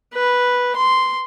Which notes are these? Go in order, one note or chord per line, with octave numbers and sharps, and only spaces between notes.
B4
C6